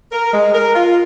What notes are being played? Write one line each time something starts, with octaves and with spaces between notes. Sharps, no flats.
A#4
G#3
A#4
F4